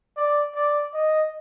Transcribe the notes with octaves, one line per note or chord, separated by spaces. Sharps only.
D5
D5
D#5